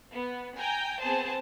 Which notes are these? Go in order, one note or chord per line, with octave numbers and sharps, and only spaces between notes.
B3
G5 G#5 A#5 G6
B3 C4 G#4 C5 A5